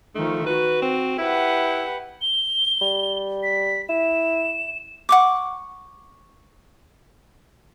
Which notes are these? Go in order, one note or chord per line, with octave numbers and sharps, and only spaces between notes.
D#3 F3 A3
F#4 B4
C4
E4 G4 B4 F#5
G7
G3
B6
E4 E7
F#5 C#6 D6